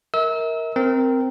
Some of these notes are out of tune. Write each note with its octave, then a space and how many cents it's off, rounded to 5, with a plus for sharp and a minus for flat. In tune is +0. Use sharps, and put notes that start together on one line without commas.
A#4 +0 E5 -45 E6 -30
C4 -5 A#4 +0